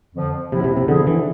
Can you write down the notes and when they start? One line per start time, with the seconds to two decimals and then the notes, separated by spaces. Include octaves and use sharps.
0.15 F2 D3 F3
0.52 A2 C3 F3 B3 E4
0.64 C3
0.77 C3
0.88 D3 F3 B3 E4 G#4
1.07 E3